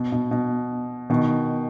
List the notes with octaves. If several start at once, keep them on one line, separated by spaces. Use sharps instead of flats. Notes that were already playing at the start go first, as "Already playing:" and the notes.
Already playing: B2
B2
B2
B2 D#3